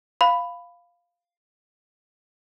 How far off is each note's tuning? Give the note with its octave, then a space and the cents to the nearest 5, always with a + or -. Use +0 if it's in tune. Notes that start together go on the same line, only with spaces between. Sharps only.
F5 +0 B5 +10